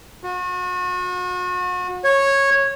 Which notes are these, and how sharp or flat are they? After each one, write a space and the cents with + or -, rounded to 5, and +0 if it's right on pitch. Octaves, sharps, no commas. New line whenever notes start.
F#4 -40
C#5 -10